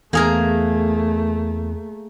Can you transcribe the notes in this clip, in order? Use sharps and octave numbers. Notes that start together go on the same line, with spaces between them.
E2 A3 A#3 G#4 A#4